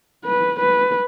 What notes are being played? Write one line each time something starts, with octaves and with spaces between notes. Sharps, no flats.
B4
B4